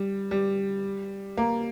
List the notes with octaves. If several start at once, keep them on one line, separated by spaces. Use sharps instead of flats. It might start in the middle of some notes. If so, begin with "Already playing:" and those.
Already playing: G3
G3
A#3